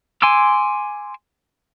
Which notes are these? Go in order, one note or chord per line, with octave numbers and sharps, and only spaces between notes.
G#5 C6 D6 E6